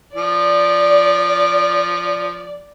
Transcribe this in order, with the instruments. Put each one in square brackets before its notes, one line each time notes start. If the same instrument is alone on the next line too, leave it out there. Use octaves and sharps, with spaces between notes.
[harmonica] F3 [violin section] D5